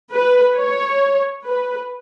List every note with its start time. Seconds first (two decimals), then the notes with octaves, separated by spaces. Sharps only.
0.12 B4
0.56 C#5
1.45 B4